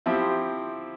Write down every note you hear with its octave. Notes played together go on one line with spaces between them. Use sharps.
F3 C4 E4 G4